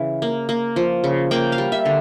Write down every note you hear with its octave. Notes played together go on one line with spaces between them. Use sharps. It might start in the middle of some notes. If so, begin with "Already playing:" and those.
Already playing: C#3 E3 F5
A#3
A#3
F3
C#3
A#3 G5
F5
G3
E5
D3